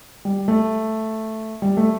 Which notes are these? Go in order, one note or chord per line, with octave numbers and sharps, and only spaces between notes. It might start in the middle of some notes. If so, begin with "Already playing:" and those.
G3
A3
G3
A3